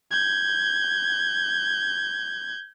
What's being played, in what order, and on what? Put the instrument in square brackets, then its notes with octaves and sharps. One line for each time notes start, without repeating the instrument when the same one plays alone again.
[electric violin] G6 G#6